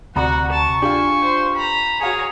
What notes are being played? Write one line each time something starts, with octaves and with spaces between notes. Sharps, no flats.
D2 C3 F#4 D5 F#5 A#5 B5
A5 C#6
D4 F4 G4 G#5
C5
A#5 B5
F#4 G#4 C#5 F5 G#5 A#5